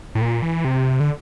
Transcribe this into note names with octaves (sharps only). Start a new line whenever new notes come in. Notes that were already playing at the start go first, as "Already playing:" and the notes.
A2
A#2
E3
C3
D3